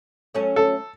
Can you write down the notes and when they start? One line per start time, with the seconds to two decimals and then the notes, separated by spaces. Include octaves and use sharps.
0.34 F#3 A3 C#4
0.56 A4